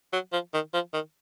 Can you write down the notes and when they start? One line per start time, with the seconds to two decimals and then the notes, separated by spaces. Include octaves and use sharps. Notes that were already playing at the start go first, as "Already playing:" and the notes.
0.13 F#3
0.32 F3
0.53 D#3
0.73 F3
0.93 D#3